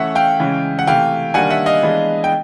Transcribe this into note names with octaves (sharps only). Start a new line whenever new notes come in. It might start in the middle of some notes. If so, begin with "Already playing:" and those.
Already playing: E3 A3 C#4 E5 F#5
F5 G5
C#3 E3 G#3 C#4
F#5
C3 E3 A3 F5 G5
D#3 G3 A#3 D4 F#5 G#5
E5 F#5
D#5 F5
E3 G#3 B3 D4
G5